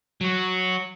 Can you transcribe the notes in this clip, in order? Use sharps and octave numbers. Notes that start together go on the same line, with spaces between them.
F#3 F#4